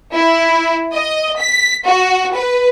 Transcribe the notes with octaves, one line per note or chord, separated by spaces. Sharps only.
E4
D#5
B6
F#4
B4